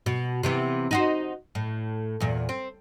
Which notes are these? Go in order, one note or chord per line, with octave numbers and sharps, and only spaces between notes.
B2
C3 E3 B3
D#4 F#4 C5
A2
E2 A#2
C4